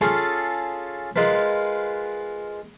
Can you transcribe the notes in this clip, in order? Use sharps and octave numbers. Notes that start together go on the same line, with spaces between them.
C#4 F4 G#4 A4
G#3 F4 A#4 B4